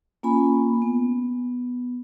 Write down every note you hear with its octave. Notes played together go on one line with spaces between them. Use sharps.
A#3 C#4 F4 G#5 B5
B3